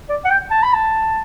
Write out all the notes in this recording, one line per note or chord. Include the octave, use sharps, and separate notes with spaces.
D5
F#5
G5
A5
B5
A5